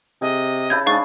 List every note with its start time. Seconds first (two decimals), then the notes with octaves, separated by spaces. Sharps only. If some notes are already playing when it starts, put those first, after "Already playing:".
0.22 C3 G#4 D#5
0.70 C#3 E4 A5 G6 G#6
0.86 G#2 D4 G#4 F5 C#6 A6